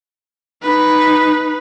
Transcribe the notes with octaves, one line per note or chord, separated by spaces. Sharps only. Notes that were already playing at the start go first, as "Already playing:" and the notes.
D#4 B4